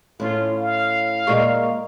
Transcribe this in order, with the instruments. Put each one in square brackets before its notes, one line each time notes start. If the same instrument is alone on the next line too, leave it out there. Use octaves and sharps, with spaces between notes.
[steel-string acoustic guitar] A2 C#4 [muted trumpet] F4
[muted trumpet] F5
[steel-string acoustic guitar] A#2 G#3 A#3 [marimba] D5 D#5 C#6